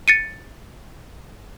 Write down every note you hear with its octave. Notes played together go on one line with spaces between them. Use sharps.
A6 C#7 D#7